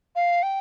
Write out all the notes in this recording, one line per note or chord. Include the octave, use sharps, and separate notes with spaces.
F5
G5